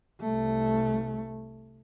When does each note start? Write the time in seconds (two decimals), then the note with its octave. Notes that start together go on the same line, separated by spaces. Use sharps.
0.21 C2 A3